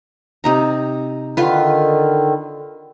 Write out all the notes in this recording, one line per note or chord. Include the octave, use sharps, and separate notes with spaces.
C3 D#4 A#5
D3 D#3 F4 B4